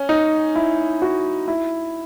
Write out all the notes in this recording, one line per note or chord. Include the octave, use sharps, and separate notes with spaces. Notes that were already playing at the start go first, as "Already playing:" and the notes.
Already playing: C#4
D#4
E4
F#4
E4